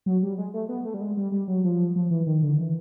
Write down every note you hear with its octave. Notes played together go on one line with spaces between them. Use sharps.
F#3
G3
G#3
A3
B3
A3
G3
G#3
G3
G3
F#3
F3
F3
E3
D#3
D3
E3